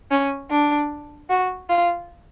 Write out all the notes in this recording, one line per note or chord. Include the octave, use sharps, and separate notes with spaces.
C#4
D4
F#4
F4